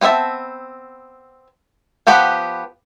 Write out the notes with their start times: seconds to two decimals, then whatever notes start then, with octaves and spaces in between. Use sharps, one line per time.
0.01 B3 C4 B4 E5 A5
2.07 F3 B3 G4 B4 F#5